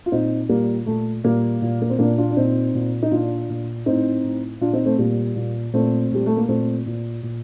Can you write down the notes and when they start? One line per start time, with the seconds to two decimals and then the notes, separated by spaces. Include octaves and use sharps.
0.06 F4
0.12 A#2 C4 D#4
0.49 A#2 G3 A#3
0.86 A#2 A3
1.24 A#2 G3 A#3
1.62 A#2
1.82 A#3
1.90 C4
1.99 A#2 A#3 D4
2.18 D4 F4
2.31 D4
2.37 A#2 C4 D#4
2.74 A#2
3.03 D#4
3.12 A#2 D4 F4
3.50 A#2
3.86 A2 C4 D#4
4.24 A2
4.61 A#2 D4 F4
4.73 C4 D#4
4.86 A3 C4
4.99 A#2 G3 A#3
5.36 A#2
5.73 A#2 A3 C4
6.12 A#2 G3
6.26 A3
6.37 A#3
6.48 A#2 A3 C4
6.86 A#2
7.23 A#2